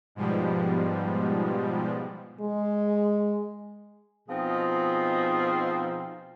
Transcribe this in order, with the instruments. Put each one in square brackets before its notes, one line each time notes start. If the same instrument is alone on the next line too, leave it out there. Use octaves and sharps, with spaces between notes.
[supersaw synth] G#2 B2 F3 G3 G#3
[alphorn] G#3
[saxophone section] B2 F3 C4 D#4 F4 G#4